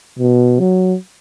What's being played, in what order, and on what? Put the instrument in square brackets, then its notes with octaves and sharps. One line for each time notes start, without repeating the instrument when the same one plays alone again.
[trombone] B2
F#3